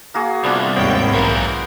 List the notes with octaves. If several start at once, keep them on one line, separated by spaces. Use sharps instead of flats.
A#3 F#4 G#4
C2 B3 D4 F4
G#1 D#2 B3 C5 C#5 G5
B1 A#2 E3 A#4